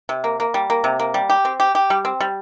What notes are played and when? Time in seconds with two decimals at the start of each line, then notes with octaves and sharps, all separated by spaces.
0.09 C3
0.24 A#3
0.40 A#3
0.54 G3
0.70 A#3
0.84 C3
0.99 A#3
1.14 G3
1.30 G4
1.45 C4
1.60 G4
1.75 G4
1.90 G3
2.05 C4
2.20 G3